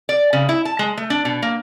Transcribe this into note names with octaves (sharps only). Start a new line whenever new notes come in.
D5
C#3
E4
A5
G#3
A3
D4
B2
A#3